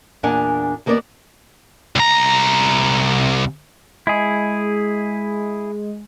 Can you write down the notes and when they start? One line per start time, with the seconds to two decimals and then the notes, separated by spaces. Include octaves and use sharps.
0.23 E2 A#2 D4 A#4 F#5 G#5
0.86 D#2 A#3 B3 A#4 C5 D5
1.96 C2 A#5
4.07 G#3 E4 G#4